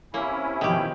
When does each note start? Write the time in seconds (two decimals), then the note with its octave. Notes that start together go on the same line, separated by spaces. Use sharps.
0.14 C3 A#3 C#4 E4
0.61 G2 B2 D#3 F3 G4